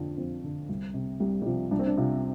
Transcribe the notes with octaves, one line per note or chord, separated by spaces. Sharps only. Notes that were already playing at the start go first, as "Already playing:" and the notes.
Already playing: F2 D3 D4 F4
F2 C4
D3
C2
C3
C2 G3
G3
C3 F3
C2 D4
C4
D4
C3 F4